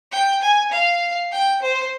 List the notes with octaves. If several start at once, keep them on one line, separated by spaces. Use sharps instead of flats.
G5
G#5
F5
G5
C5